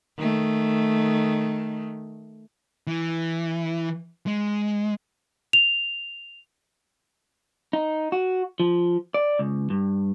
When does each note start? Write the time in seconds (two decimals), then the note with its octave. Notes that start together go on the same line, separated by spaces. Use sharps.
0.18 D#3 A3
2.87 E3
4.27 G#3
5.53 F7
7.73 D#4
8.12 F#4
8.60 F3
9.14 D5
9.39 C#2
9.70 G2